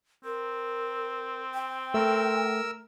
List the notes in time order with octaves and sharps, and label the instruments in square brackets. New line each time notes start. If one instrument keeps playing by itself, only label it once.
[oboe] C4 [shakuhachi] A#4
[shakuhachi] G5
[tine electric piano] A3 [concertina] A#4 E6